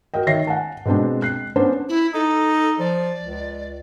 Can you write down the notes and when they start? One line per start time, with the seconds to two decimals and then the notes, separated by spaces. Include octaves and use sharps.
0.14 F#4 A#4 D#5 G5
0.27 D#3 C#5 E5 A#6 C7
0.47 F#5 G#5 A5
0.85 B2 G#3 C4 D4
1.22 F#6 C7
1.56 B3 C#4 D4 C5
1.89 E4
2.14 D#4 A4
2.79 F3 D5
3.23 C#2